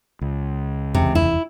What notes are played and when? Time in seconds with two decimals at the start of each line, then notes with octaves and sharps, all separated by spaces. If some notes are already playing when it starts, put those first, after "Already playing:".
0.21 C#2
0.95 F1 E2 C3
1.15 E4